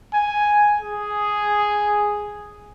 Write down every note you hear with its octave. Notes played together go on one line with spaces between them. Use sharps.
G#5
G#4